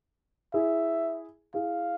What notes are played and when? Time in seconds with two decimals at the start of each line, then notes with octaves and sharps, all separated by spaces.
0.53 E4 G#4 E5
1.54 E4 G#4 F5